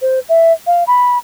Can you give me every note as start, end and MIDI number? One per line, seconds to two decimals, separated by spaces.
0.02 0.19 72
0.29 0.53 76
0.67 0.84 77
0.87 1.18 83